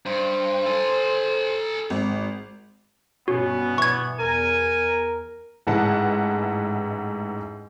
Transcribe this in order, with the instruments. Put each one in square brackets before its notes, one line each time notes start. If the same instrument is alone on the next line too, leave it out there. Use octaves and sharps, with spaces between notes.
[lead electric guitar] G2 [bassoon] C5
[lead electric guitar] A4 G#5
[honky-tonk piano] G#1
[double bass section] G2 B2 [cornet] B3 [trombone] C#4 [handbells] F#4
[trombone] E3 [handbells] C#6 G#6
[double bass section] E2 [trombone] A#4 [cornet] G#5
[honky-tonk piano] A1 G#2 E3 E4 F#5 A5